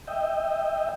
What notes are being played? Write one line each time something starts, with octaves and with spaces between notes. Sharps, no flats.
D#5 E5 G5